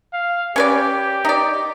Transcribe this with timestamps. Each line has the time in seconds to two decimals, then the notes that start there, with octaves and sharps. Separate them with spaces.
0.13 F5
0.56 C#4 G4 B4 D5
1.25 D#4 D5